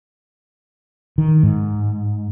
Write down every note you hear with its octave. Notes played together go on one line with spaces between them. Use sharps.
D#3
G#2